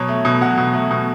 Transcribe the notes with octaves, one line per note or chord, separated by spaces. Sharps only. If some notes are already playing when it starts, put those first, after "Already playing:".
Already playing: B2 F#3 C#5
A3
B2
F#3 F#5
B2
A3
B2